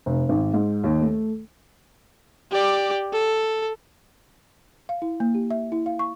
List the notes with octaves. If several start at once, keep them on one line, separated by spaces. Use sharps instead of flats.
F1
G#1
G#2
D#2
A3
G4 D5
A4
F5
E4
A#3
G4
E5
E4
F5
C#6